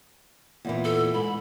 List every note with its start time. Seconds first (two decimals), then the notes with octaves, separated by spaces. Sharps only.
0.65 E2 A#2 E3
0.84 A4
1.14 G#2 B5